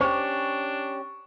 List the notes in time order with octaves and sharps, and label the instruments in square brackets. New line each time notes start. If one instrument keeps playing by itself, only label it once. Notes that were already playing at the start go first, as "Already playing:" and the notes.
[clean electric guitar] C#4 G4 [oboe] D4 [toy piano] C5 [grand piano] C#6